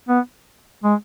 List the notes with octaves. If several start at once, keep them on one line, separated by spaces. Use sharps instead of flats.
B3
G#3